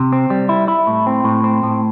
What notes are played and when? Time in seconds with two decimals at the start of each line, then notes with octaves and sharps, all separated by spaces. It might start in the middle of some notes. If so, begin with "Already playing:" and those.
Already playing: C3
0.13 C4
0.30 G3
0.49 E4
0.68 E4
0.87 A2
1.07 C4
1.24 A2
1.44 C4
1.63 A2